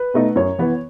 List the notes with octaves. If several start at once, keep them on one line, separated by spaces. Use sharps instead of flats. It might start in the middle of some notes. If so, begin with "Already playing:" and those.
Already playing: B4
B2 A3 D#4
F#2 C#5
E3 B3